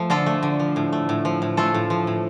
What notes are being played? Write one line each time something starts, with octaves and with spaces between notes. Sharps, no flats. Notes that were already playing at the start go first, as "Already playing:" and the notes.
Already playing: F3 A3
D3 F4 A4
A3
D3
F3
A2
A3
A2
F3
A2
A3 F4 A4
A2
F3
A2